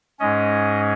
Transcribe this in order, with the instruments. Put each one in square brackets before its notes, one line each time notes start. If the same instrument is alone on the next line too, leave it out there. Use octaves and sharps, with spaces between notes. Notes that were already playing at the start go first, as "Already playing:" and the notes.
[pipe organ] G#2 G#3 C#4 D#5